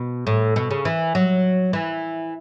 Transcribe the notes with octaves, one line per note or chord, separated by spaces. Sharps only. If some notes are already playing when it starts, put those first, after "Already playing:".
Already playing: B2
A2
B2
C#3
E3
F#3
E3